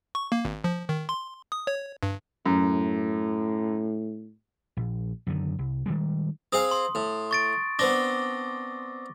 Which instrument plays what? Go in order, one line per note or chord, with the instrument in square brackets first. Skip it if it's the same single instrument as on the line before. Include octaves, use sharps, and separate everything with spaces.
[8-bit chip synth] C#6
A#3
G#1
F3
D#3
C6
D#6
C#5
G2
[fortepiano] F#2 [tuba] A2
[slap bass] A#1
F#2 D3 D#3
C2
D#3 G3 G#3
[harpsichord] C4 G#4 F5 [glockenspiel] D#6
[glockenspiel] C6
[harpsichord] A2
[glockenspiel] C#6 A6 D7
[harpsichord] B3 C4 D4 [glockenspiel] D6 A#6 G7